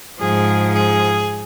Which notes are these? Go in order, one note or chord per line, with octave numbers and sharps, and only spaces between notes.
G#2 F3 G#4
G#4